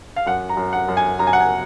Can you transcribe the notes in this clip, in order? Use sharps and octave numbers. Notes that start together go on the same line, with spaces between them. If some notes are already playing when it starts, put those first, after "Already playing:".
F5
F#2 F#5
A#5
F#2
F#5
F#2
G#5
F#2 A#5
G#5
F#5
G#5